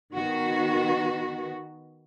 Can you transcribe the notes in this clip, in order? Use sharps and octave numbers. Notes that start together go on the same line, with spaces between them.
D#3 B3 F#4